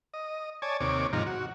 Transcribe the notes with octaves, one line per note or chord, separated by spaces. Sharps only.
D#5
C#5 D5 G#5 A5
D#2 C3 C#5 D6
G#2 C3 D#3 F3 A#5
F#4